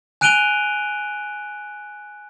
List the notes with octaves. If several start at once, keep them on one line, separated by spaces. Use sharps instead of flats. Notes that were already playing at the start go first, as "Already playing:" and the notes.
G#5 F#6 D7 D#7 F7 G7